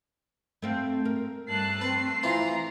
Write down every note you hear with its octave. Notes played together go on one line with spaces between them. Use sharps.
A3 C4 F5
A#4
G2 A3 A5 F#6 C7
C4 B4
E3 F4 C5 A#5